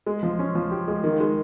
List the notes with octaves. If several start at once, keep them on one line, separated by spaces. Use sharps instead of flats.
G#3
F3
C#4
F3
G4
G#3
D#3
G#3